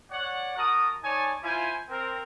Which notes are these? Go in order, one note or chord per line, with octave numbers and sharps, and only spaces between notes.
C#5 D5 F#5
F#4 A#4 A5 D#6
D#4 C#5 D5 G#5 A5
E4 F4 C5 G#5
C4 A#4